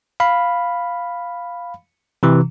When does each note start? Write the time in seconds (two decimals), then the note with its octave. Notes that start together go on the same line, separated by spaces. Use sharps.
0.20 F5 B5
2.23 C3 E3